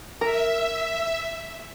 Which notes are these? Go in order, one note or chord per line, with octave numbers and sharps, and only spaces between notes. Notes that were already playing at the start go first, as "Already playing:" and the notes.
A#4 E5